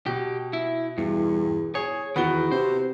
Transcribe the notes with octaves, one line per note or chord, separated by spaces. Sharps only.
B2 G4
E4
E2 G2
G#4 C#5
E2 D#3 B3 F#4 G7
C3 C5